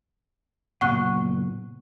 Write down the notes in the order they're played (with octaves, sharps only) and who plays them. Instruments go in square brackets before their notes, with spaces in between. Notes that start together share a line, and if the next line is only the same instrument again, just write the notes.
[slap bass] F#1 A#2 B3 [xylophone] F#5 C#6 F#6